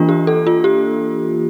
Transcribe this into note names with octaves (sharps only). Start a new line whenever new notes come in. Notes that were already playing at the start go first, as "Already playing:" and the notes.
Already playing: E3 A#3 D4 F4
G4
A4
F4
G4